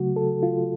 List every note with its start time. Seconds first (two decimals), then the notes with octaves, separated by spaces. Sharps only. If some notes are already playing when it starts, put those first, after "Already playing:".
Already playing: C#3 F#3 A3 F#4
0.16 A4
0.43 F4